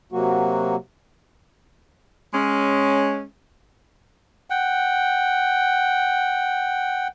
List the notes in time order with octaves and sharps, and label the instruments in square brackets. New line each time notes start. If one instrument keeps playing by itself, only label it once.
[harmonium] C3 F#3 A#3 F#4
[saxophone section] G#3 C#4
[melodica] F#5 G5